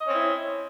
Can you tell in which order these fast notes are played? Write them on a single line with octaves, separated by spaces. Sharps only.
D#5 C#4 C4 E4